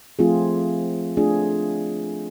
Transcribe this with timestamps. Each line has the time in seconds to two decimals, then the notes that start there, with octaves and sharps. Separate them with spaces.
0.19 F3 A3 C4 F4 G#4
1.17 A3 D4 F4 G#4